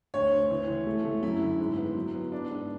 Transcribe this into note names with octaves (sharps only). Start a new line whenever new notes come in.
D2 C#5
D2
E3
E3
A3
A3
F#2 E4
D3
G#2
B3
F#3
B3
B3 D4
G#2